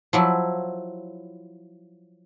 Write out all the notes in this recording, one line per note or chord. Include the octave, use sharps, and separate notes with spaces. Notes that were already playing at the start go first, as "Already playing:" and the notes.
F3 F#3 E4